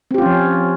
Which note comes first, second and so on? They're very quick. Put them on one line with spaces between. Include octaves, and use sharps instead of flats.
C4 G4 F4 C#4 F3